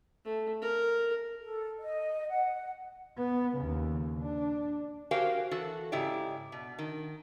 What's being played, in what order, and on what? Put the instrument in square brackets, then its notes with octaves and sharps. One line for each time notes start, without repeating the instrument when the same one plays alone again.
[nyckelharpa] A3
A#4
[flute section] A4
D#5
F#5
[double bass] B3
D#2 C#3
D4
[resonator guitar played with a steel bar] F#4 G4 A#4 C5 F5 G#5
E3 F#4 A4
G#2 C#3 E4 G4 D5
B2
D#3